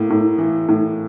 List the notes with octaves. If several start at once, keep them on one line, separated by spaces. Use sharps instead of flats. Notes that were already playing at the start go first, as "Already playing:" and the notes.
Already playing: A2 A#3
A2
E3
A2